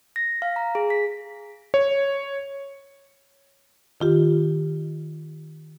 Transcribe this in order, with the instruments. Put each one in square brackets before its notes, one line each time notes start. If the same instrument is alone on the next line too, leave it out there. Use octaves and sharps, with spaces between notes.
[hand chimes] A#6
F5
A#5
G#4
B6
[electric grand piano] C#5
[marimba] D#3 F4 G4